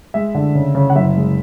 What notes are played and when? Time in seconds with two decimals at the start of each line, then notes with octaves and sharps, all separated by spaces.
0.14 G#3 E5
0.35 D3
0.55 C#3
0.75 C#3
0.90 F#5
0.95 F#1 E5
1.16 G#3